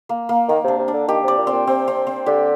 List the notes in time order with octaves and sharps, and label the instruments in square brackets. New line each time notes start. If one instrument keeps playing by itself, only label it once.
[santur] A#3
A#3
[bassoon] D#3 [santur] A#3
[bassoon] C3 [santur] D4
[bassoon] C3
[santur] D4
[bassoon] D3
[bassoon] D#3 [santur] G4
[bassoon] C3 [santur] D5
[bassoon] A#2
[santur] C4
[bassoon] A#2
[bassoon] C3 [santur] C4
[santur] C4
C4
[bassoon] D3 [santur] G4